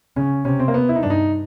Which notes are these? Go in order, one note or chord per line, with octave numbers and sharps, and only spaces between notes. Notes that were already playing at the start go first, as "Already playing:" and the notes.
C#3 C#4
C3 C#4
C4
A#3
B3
E4
D#4
G2 D4
D#4